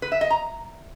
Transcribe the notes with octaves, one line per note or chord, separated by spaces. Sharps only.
B4
E5
D#5
A#5